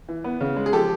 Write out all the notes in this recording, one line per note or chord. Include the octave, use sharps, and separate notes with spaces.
E3
B3
C#3
G#3
G#4
F3 G4 A4